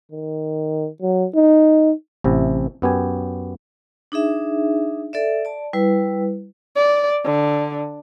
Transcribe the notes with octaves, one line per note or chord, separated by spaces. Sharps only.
D#3
F#3
D#4
A1 C3 E4
F#2 B3 G4 G#5
D4 D#4 G#4 E5
A4 D5 E5
D5 A5
G3 E4 B4
D5
D3